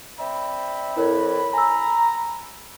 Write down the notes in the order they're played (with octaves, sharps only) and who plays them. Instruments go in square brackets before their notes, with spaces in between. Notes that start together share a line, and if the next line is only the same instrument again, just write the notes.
[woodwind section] C4 D5 E5 [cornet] B5
[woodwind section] F2 [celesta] E4 A#4 C#5
[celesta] G#5 E6 [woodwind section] A#5